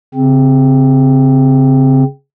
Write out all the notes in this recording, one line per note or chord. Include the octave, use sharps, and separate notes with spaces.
C#3 C4